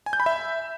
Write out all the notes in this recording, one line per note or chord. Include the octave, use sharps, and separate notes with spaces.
G#5
G6
B5
E5